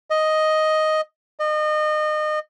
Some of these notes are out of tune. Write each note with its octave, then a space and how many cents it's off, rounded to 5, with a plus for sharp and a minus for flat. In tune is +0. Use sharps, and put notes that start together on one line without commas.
D#5 +5
D#5 -30